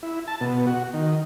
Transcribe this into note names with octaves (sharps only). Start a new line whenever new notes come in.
E4
A5
B2
F#4
D#3